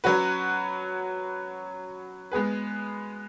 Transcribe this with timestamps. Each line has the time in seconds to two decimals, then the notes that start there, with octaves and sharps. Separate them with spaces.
0.04 F#3 C#4 F#4 B4
2.32 G#3 B3 G#4 B4